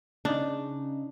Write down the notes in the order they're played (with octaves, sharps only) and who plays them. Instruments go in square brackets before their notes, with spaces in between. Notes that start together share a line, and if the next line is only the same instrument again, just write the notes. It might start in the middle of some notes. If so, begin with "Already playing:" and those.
[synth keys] C#3 D#4 [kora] D4